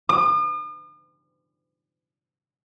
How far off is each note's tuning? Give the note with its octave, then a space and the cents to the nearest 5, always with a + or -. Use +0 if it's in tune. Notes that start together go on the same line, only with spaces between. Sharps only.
D#6 -45